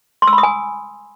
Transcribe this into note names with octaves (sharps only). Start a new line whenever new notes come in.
C6
E6
B5
D#6
G#5